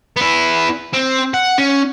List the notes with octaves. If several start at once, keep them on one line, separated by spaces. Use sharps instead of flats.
B3 E4
C4
F#5
C#4